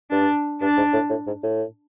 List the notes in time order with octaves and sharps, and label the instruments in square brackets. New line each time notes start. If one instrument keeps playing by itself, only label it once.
[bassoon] G2 [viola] D4
[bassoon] G2 [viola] D4
[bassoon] G#2
A2
A2
G#2
A2